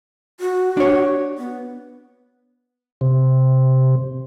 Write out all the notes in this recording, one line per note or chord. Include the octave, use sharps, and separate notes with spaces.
F#4
D4 C#5
B3
C3